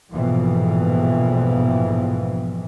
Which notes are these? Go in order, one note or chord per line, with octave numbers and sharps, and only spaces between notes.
A#1 F2 G#2 B2 E3 F3